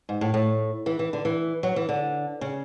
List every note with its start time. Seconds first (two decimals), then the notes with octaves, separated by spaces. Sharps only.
0.09 G#2
0.21 A2
0.34 A2
0.86 E3
0.99 E3
1.13 D3
1.25 E3
1.63 F#3
1.76 E3
1.89 D3
2.41 C#3